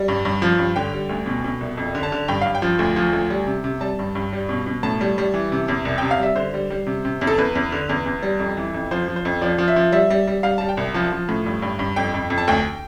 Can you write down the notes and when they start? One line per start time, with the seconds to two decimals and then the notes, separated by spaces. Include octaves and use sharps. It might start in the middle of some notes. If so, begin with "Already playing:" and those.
Already playing: G3
0.08 G2
0.25 G2
0.42 F3
0.59 G2
0.76 D3 G5
0.93 G3
1.09 D2
1.26 B2
1.44 B2
1.61 C2
1.77 F2
1.95 D3
2.03 A5
2.12 D3
2.28 G2 G5
2.41 G2 F5
2.55 G5
2.62 F3
2.79 D2
2.96 F3
3.13 D2
3.30 G3
3.47 C3
3.64 C3
3.81 G3 A5
3.99 G2
4.15 G2
4.33 G3
4.49 B2
4.66 B2
4.83 A2 A5
5.01 G3
5.18 G3
5.34 E3
5.52 C3
5.68 E2
5.85 C2
5.98 C3 G5
6.11 F5
6.19 G3 E5
6.36 D3 C5
6.54 G3
6.70 G3
6.87 C3
7.05 C3
7.21 E2
7.27 A4
7.38 E2 B4
7.55 E2
7.72 D3
7.89 E2
8.06 E2
8.22 G3
8.39 F2
8.57 E3
8.74 F2
8.91 F3 C5
9.08 F3
9.16 C5
9.25 F2
9.41 F3 D5
9.58 F3
9.68 E5
9.76 F3
9.92 G3 E5
10.10 G3
10.27 G3
10.43 G3 F5
10.58 G3 A5
10.69 G5
10.77 C2
10.94 F3 A5
11.12 F3
11.29 A2
11.46 G2
11.62 G2
11.79 G2
11.96 F2 G5
12.14 F2
12.30 F2
12.38 A5
12.48 D2 G5